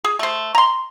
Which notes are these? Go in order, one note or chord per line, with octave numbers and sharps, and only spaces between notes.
G#4
A3 C5
A#5 C6